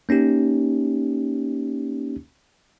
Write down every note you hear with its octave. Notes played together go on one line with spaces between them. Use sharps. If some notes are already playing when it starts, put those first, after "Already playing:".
A#3 C#4 D#4 G4